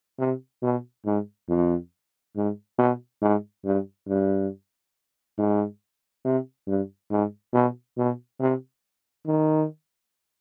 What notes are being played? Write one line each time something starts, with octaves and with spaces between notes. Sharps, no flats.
C3
B2
G#2
F2
G#2
B2
G#2
G2
G2
G#2
C3
G2
G#2
B2
B2
C3
D#3